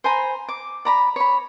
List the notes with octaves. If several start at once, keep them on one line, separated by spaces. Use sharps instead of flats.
C5 G#5 A#5 B5
D6
D5 A#5 B5
C#5 B5